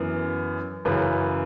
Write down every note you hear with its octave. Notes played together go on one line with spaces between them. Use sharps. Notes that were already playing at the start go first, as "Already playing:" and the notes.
Already playing: F#2 E3 B3
F#2 C#3 E3 B4